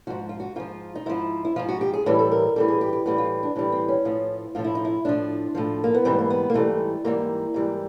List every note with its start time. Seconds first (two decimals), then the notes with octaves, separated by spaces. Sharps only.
0.07 G#2 F3 F#4
0.29 F4
0.40 F#4
0.56 G#2 F3 F4
0.95 D#4
1.06 G#2 F3 E4
1.45 E4
1.56 G#2 F3 F4
1.69 F#4
1.81 G4
1.94 G#4
2.06 A2 E3 G3 B4
2.19 A4
2.32 A#4
2.56 A2 E3 G3 A4
2.68 G#4
2.81 G4
2.93 G4
3.06 A2 E3 G3 F#4
3.18 F4
3.43 D4
3.56 A2 E3 G3
3.72 C4
3.88 C#4
4.05 A2 F3
4.55 A2 F3 F4
4.64 E4
4.75 D#4
4.85 E4
5.05 A2 F3 D4
5.55 A2 F3
5.84 A#3
5.95 B3
6.05 G#2 E3 G3 C4
6.19 A#3
6.30 B3
6.50 A#3
6.54 G#2 E3 G3 A3
7.04 G#2 E3 G3 A#3
7.54 G#2 E3 G3